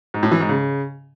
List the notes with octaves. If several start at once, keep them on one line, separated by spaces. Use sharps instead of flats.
G#2
A2
E3
G#2
C#3